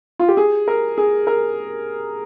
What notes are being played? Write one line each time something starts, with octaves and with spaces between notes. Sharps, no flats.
F4
G4
G#4
A#4
G#4
A#4